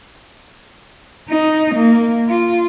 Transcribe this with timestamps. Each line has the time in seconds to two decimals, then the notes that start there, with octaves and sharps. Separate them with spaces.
1.29 D#4
1.75 A#3
2.28 F4